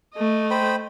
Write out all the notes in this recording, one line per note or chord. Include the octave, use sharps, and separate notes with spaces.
A3 D#5
C5 G5 B5